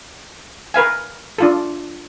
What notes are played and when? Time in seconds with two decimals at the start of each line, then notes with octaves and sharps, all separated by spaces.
0.74 A#4 B4 F5 G#5
1.38 D4 F4 A4